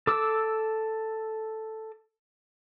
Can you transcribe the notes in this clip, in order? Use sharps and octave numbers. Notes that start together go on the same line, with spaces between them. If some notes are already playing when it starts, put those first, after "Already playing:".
A4 D6 E6